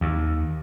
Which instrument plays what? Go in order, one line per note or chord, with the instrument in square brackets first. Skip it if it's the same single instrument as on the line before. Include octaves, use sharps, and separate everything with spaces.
[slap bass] D#2